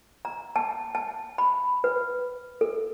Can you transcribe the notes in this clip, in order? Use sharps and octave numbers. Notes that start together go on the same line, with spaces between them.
A#5
A5
A5
B5
B4
A4